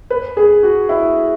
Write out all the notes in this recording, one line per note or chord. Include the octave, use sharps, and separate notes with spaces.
B4
G#4
F#4
E4